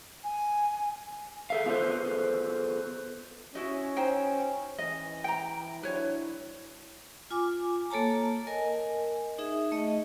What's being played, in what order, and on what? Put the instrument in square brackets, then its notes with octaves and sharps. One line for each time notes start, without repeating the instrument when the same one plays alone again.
[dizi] G#5
[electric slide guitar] G#4 A4 E5 F5
B3 F4 G#4 A4 B4 C5
[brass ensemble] C#4 [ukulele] E4 F#4 D#5
[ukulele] D#4 C5 G5
[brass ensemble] E3 [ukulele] D#5
[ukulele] G5 A#5
[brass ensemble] F#3 D4 E4 [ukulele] B4 C#5
[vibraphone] F4 G#5 D6
A#3 A4 C#5 A5 A#5
A#4 D#5 G#5
D#4 G#4 E5
A3 D#5